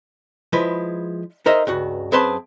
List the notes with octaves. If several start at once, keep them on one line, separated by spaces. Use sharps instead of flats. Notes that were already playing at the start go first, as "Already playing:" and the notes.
F3 G#3 E4 B4
D#4 G#4 A#4 C5 D#5 E5
C#2 G2 F#4
F#2 C4 G#4 B4 A5 C6